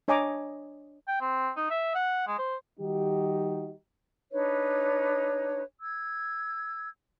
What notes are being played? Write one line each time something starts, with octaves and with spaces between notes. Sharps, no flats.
D4 C#5 D#5 G#5 A#5 D6
G5
C4
D#4
E5
F#5
G#3
C5
D#3 G3 D#4 F#4 G4
D4 D#4 B4 C#5
E6 G#6